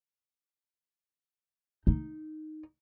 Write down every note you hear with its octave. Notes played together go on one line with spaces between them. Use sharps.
D#4